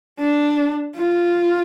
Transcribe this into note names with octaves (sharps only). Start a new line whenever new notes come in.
D4
F4